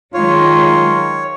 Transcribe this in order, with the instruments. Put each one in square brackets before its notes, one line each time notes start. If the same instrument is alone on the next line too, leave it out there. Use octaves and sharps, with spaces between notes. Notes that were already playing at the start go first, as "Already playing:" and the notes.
[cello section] D#3 F#3 G#3 [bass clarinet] F4 [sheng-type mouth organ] C#5